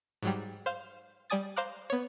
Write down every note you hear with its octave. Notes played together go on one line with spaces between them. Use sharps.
G#2 F#3 G3
C5 F5
G3 D5 G#5 D#6 A6
C5 F5 A#5 D6 F#6
B3 C#5